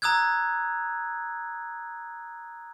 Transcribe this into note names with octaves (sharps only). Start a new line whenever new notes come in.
A#5 D#6 E6 F#6 G#6